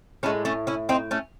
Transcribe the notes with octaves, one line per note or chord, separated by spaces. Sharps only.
A2 G#3 A3 C#4
A3 C#4
C#4 E4
C4 D#4
A3 C#4